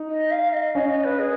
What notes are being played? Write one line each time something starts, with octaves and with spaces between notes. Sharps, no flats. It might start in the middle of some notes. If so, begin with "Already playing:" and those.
Already playing: D#4
D#5
F5
D#5
C#4 D#5
D#5
B4
G#4